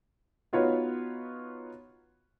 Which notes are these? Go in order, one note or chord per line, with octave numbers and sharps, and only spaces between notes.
B3 D#4 F4 F#4 B4 C#5